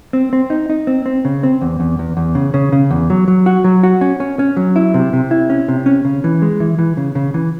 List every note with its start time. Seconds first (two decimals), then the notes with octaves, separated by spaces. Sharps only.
0.13 C4
0.33 C4
0.50 D#4
0.70 D#4
0.87 C4
1.06 C4
1.25 C#3
1.43 C4
1.62 E2
1.80 E2
1.99 E2
2.17 E2
2.35 C#3
2.54 C#3
2.72 C#3
2.91 E2
3.10 F#3
3.28 F#3
3.46 F#4
3.64 F#3
3.83 F#4
4.01 C#4
4.20 C#4
4.39 C#4
4.57 F#3
4.76 E4
4.94 C3
5.13 C3
5.31 E4
5.50 C#4
5.68 C3
5.86 C#4
6.05 C#3
6.24 E3
6.42 G#3
6.60 E3
6.79 E3
6.97 C#3
7.15 C#3
7.34 E3